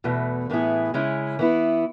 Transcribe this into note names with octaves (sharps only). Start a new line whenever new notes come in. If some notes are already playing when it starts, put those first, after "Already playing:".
E2 B2 A3
A2 E3 B3 E4 G#4
C#3 G#3 C#4 E4
E3 B3 E4